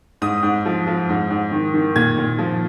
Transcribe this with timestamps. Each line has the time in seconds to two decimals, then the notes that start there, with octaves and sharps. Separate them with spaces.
0.22 G#2 D#6
0.43 G#2
0.66 F3
0.87 F3
1.09 G#2
1.30 G#2
1.52 D#3
1.74 D#3
1.95 A#2 G#6
2.18 A#2
2.39 F3